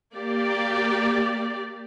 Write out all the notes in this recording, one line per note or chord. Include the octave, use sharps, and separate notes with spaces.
A#3 G4 D5